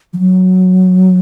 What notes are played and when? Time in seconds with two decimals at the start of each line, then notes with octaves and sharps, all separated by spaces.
0.13 F3
0.19 F#3